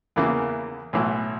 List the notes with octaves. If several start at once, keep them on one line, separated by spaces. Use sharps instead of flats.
E2 C#3 E3 A#3
B1 A2 E3